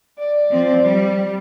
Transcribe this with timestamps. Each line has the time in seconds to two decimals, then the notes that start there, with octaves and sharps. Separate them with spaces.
0.19 D5
0.50 F3 C4
0.82 G3